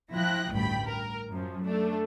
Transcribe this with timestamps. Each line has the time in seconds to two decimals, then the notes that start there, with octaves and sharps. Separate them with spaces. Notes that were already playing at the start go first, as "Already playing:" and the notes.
0.13 F3 E4 G5 F#6 A#6
0.52 A1 D2 G2 G5 B5
0.87 A#4
1.33 F#2 F3
1.65 A3 D4